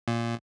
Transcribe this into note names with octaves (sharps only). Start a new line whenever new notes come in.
A#2